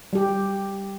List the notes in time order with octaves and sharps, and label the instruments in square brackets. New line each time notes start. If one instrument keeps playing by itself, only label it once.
[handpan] G3 G4